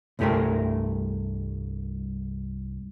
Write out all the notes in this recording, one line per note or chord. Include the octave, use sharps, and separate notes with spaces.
C2 G2 A3 G4 G#4 A#4